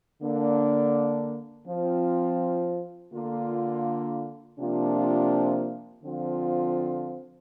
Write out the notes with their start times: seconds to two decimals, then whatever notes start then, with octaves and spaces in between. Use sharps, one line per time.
0.22 D3 A#3 D4
1.68 F3 C4 F4
3.14 D3 A#3 F4
4.58 C3 F3 A#3 D4 F4
6.03 D3 F3 C4 F4